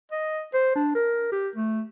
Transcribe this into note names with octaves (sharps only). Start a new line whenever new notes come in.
D#5
C5
D4
A#4
G4
A3